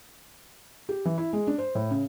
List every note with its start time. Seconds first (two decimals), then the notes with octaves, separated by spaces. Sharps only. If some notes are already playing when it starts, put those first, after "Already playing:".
0.89 G4
1.05 E3
1.18 E4
1.33 G#3
1.47 D4
1.58 C5
1.75 A2
1.91 C#3